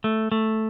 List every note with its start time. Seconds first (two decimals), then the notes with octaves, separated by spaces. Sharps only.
0.04 A3
0.32 A3